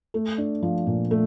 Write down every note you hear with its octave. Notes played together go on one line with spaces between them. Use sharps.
A3
D4
F3
A#2
A3